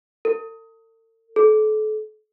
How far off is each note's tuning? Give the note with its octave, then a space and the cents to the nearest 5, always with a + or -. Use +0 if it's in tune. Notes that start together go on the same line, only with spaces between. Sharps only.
A4 +45
A4 -35